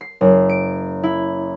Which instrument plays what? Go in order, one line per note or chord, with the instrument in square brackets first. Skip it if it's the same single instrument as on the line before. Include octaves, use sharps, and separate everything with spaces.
[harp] C7
F#1
D7
E4